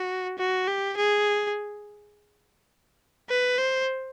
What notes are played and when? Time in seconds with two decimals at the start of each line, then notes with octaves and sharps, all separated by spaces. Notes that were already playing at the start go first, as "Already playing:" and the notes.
Already playing: F#4
0.38 F#4
0.67 G4
0.96 G#4
3.29 B4
3.58 C5